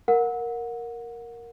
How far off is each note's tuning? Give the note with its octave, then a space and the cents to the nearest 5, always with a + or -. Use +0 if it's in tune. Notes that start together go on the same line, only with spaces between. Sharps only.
A#4 +0 F#5 -25